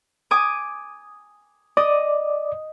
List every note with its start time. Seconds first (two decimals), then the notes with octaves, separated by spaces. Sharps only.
0.31 G#5 D6 D#6
1.77 D5 D#5